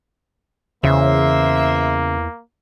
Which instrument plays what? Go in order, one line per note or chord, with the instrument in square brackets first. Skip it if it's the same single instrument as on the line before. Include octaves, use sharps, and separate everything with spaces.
[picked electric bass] E2 E3 [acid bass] C#3 [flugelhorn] A#3 [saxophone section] C5 E5